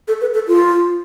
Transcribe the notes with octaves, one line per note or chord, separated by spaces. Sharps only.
A4
B4
A4
F4